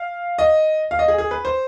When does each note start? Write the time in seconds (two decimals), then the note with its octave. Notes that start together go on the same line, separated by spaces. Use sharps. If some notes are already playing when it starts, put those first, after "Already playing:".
Already playing: F5
0.38 D#5
0.91 F5
0.99 D#5
1.08 G#4
1.18 G#4
1.31 B4
1.45 C5